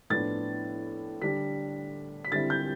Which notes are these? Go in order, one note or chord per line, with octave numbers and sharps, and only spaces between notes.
A2 F3 B3 D4 A6
D3 G3 D4 B6
B6
D3 G3 C4 E4 A6
G6